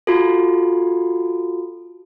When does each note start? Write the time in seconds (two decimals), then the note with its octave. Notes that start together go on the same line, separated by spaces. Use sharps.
0.07 F4 F#4 A4